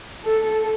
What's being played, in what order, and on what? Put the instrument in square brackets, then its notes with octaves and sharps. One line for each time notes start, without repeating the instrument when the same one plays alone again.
[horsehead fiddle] A4